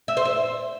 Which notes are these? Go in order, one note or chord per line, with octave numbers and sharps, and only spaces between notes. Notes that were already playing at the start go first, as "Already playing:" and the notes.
E5
C5
E5